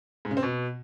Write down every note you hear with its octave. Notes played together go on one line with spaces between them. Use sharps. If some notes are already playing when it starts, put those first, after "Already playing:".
G#2
C#3
C4
B2